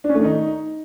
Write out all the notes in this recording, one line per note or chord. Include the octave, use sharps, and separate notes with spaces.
D4
C#4
A3
D#3
D#4